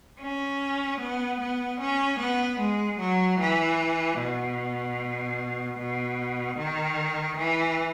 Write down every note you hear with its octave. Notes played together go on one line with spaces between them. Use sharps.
C#4
B3
B3
C#4
B3
G#3
F#3
E3
B2
B2
D#3
E3